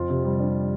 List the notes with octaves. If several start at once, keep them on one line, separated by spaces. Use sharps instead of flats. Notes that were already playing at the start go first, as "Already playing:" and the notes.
Already playing: F2 F4
C3
G3
D4